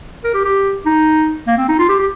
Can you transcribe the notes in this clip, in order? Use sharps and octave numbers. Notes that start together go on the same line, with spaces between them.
A#4
G4
G4
D#4
A#3
C4
D#4
F4
G4
G4